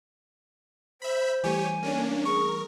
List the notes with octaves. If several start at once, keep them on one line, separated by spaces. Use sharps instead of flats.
C5 E5 B5
E3 G3 A3 G4 C#5 G#5
A#3 C#4 D4 C#5
G#4 A#4 C#6